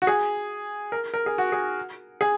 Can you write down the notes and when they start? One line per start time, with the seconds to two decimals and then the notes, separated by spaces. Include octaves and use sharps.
0.02 F#4
0.07 G#4
0.92 A#4
1.14 A#4
1.26 G#4
1.38 F#4
1.52 G#4
2.21 G#4